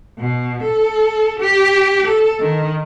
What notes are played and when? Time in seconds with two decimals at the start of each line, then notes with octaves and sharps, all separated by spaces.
0.18 B2
0.63 A4
1.40 G4
2.08 A4
2.40 D#3